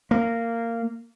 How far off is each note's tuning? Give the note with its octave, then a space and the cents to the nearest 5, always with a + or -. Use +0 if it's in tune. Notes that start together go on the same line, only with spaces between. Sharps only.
A#3 -15